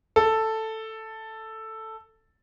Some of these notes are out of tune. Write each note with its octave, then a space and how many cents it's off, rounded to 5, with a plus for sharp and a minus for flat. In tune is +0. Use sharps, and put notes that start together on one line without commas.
A4 +5